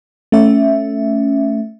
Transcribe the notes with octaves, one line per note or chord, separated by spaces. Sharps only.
A3 C#4 E5